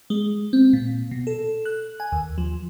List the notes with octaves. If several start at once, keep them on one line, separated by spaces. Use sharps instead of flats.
G#3
C4
A#2
B2
A4
F#6
G#5
D#2
F3